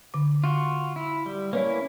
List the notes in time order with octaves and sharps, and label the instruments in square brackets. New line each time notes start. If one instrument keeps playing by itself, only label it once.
[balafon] D3 D6
[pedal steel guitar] F4 F#4
E4
G3
[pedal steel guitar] A#3 C#4 E4 [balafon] B4 C#5 D5